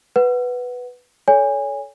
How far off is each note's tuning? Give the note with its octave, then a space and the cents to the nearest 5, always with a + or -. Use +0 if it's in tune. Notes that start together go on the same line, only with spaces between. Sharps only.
B4 +0 F#5 +0
A4 -20 C#5 +25 G#5 -25